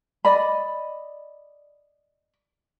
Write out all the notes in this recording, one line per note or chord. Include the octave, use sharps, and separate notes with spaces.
D5 D#5 B5